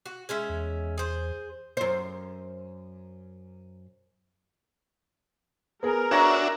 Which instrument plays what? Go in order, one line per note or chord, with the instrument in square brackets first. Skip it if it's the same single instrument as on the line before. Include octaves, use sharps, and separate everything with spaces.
[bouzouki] F#4
G#3 C#4 E5
[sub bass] E2
[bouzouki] G#4 C5
[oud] F#2 C5
[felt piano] B3 G#4 [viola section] A#4
[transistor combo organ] D4 F#4 E5 [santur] C#5 A#5